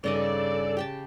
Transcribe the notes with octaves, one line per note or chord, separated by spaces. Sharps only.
G2 C#3 D#4 A4 D5 D#5 G#5
G4 G5 A5